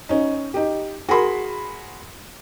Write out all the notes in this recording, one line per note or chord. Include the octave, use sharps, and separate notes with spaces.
C#4 D#4
D#4 G4
F#4 G#4 A#4 B5 C6